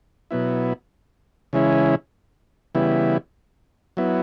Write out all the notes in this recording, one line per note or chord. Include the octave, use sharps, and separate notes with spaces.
B2 F#3 B3 E4
C#3 E3 G#3 C#4 E4
C#3 E3 G3 B3 E4
F#3 B3 E4